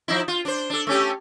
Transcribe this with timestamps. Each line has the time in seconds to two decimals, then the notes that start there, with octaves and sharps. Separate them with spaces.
0.08 F3 D#4 E4
0.28 F4
0.45 D4 C5
0.70 D4 A4
0.87 A3 C#4 G4